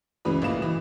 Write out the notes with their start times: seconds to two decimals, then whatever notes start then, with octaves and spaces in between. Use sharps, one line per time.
0.25 C#2 C#3 E3 B4 B5
0.42 A1 A#2 E3 D#5 F5 E7
0.62 E3